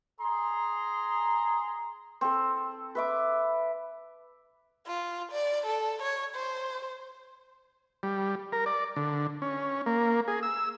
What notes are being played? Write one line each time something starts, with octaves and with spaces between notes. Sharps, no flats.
G#4 A#5 C6
C4 A4
B4 E5 D6
F4
D5
A4
C#5
C5
G3
A#4
D5
D3
C#4
A#3
G#4
E6